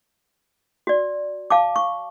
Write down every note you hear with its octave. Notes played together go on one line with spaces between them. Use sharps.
F#4 D5
F5 A5 D6
C#6